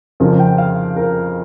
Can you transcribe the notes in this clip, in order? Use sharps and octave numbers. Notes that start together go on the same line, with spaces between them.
F2 C#3 F3 A#4
G5
F5
A#4